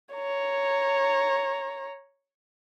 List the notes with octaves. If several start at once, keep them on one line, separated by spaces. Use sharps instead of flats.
C#5 A#5